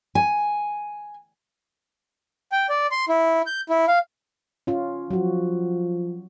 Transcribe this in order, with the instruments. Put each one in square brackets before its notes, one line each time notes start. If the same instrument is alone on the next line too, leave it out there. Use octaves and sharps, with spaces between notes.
[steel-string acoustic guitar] G#5
[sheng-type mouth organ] G5
D5
C6
E4
G6
E4
F5
[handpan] C#4 F4
[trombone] F3 [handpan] F#3 F#4